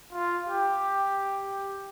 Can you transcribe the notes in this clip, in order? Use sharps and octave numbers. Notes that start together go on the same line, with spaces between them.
F4
G4